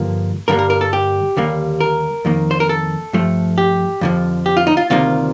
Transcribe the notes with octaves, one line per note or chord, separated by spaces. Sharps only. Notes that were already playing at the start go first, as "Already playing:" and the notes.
Already playing: G2 D3 F3 A#3
G2 D3 G3 A#3 A#4
A#4
A#4
A4
G4
D#2 D3 G3 A#3
A#4
F2 D#3 A#3
C5
A#4
A4
G2 F3 A3
G4
F2 D3 F3
G4
F4
D#4
F4
D2 C3 D#3 G3 A#3 F4